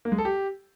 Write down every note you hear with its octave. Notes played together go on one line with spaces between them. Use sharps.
A#3
G#3
A4
G4